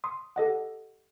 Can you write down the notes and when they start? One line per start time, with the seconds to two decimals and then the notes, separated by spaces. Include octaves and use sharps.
0.04 C6 D#6
0.36 G4 A4 D#5 F#5